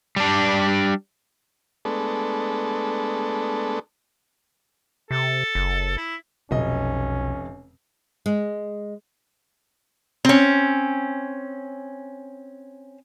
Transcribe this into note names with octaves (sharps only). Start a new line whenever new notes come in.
G3 D4
G#3 A3 B3 D4 A4
C3 A4
F#1
E4
F1 B1 C#4 D#5
G#3
C4 C#4